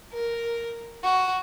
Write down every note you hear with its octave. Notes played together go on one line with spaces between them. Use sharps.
A#4
F#4